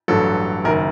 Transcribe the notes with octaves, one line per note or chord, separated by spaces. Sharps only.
A1 G2 F#3 A4
F#1 F#2 D#3 A#4